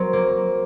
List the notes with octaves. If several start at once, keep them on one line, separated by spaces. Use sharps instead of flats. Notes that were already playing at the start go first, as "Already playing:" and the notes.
Already playing: F#3 C4 A#4
A#3